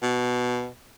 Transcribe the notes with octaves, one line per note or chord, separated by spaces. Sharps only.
B2